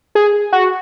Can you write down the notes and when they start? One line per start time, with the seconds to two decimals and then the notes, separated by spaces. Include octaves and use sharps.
0.15 G#4
0.53 F#4